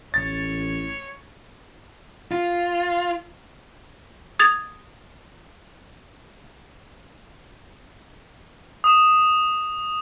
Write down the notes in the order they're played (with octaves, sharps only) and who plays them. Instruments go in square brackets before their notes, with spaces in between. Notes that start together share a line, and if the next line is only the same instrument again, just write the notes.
[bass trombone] A1 [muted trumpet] C#5 [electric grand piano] A6
[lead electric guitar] F4
[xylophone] D#6 G#6 A6 F7
[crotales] D#6 E7